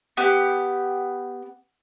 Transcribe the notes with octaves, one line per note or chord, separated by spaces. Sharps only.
B3 G4